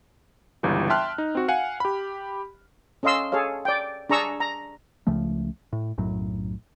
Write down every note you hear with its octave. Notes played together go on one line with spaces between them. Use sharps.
G1 C#2 E3 G3
E5 G5 A5 C6 F6 F#6
D#4
C4 F#4
F5 F#5 G#5
G4 B5
C#4 A4 D#5 F5 C6 E6
G#4 A4 C#5 F5
D5 G5
D4 G#4 A#5 C#6 E6
A#5
C#2 C#3 F3 A3
A2
B1 F#2 A2 F#3